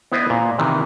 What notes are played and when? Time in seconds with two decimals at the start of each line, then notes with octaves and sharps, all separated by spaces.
0.12 B3 E4 C5 D5 D#5
0.30 A#2
0.59 C3 D#3 E3